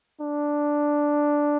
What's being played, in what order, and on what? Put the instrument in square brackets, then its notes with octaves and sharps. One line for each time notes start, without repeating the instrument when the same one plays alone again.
[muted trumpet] D4